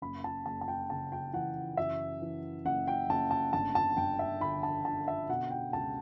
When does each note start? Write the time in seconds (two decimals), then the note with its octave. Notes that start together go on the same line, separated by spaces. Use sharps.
0.02 F#1 B5
0.24 A5
0.46 F#1 A5
0.61 A5
0.68 G5
0.90 C#3 A5
1.12 G5
1.33 E3 F#5
1.77 F#2 E5
2.22 E3
2.65 F#1 F#5
2.88 G5
3.09 F#1 A5
3.31 A5
3.53 G1 A5
3.75 A5
3.97 G1 G5
4.19 E5
4.41 D3 B5
4.63 A5
4.85 D3 A5
5.08 E5
5.29 B2 F#5
5.51 G5
5.73 C#2 A5